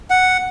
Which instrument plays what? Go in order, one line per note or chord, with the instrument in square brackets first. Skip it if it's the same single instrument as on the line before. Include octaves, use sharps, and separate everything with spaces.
[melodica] F#5